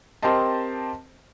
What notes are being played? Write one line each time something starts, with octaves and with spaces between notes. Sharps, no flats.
C4 G4 A#4 C5 D#5 A5